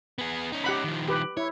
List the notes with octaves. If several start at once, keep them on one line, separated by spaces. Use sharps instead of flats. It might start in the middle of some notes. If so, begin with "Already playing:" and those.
B3 G#4
C#4 D#4
G4 F#5 B5
D#3 F3
G4 B4
E4 C#5